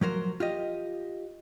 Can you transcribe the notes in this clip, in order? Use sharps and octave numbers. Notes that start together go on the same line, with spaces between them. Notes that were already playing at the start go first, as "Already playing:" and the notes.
F3 F#3 A#4 C5
F4 G4 D#5